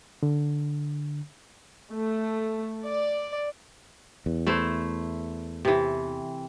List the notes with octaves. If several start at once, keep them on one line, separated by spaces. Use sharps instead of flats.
D3
A3
D5
E2
A3 E4 C5
C3 E3